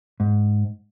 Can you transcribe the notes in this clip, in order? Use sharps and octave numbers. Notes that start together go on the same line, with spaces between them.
G#2